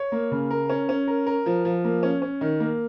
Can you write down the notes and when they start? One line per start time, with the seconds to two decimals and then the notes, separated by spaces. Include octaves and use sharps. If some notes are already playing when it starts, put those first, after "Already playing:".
Already playing: C#5
0.12 A#3
0.31 C#3
0.51 A#4
0.69 C#4
0.89 C#4
1.08 A#4
1.27 A#4
1.46 F3
1.65 F3
1.84 A#3
2.03 C#4
2.22 C#4
2.41 D#3
2.60 A#3